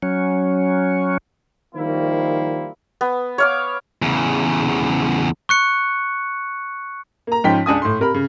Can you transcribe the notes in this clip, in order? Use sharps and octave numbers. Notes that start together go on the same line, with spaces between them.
F#3 C#4
D#3 F3 G3 A#3 E4 C5
B3
C#5 F5 D6
E2 C#3
C#6 F#6 C#7
A#3 A#5
G#2 F3 C#4 G5 B6
C#2 D4 G#5 D#6
A2 C6
C3 A#4 B5
C#3